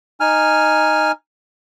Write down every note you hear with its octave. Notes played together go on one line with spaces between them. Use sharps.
D#4 G#5 F6